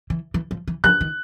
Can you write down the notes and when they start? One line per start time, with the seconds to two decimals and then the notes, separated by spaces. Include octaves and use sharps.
0.10 E3
0.34 E3
0.51 F3
0.68 E3
0.84 F3 F#6
1.01 D#3